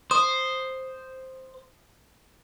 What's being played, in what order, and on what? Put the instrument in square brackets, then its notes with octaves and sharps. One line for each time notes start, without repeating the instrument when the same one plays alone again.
[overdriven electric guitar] C5 [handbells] D#6